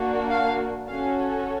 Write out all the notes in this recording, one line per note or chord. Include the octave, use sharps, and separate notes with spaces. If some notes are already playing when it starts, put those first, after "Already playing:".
Already playing: A#3 D4 F#4
F5
C#4 F#4 A4 F5